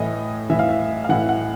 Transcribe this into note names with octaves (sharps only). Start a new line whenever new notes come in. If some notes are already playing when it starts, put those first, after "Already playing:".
Already playing: A2 E3 D#5
A2 E3 E5
F5
E5
F5
A2 E3 F#5
F#5